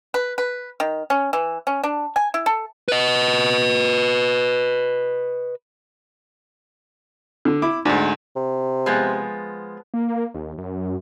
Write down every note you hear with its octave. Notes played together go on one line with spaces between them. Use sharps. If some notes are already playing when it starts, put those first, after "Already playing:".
B4
B4
D#3
C#4
E3
C#4
D4
G#5
E4
A4
B4 D#5
D3
E4 D6
D2 G#2 D4
C3
F3 G#3 B3
A#3
D#2
F#2